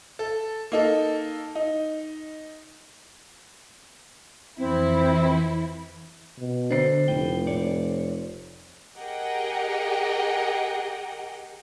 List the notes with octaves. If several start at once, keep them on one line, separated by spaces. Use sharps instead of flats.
A4
A#3 D#4 A4
D#4
F2 E3 C4 E4
B2
D3 D4 C5 C7
F1 A2 G5
C#5 D5
G4 G#4 A#4 D#5 F#5 G5